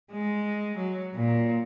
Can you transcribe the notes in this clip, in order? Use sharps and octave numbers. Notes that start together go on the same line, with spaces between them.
G#3
F#3
A#2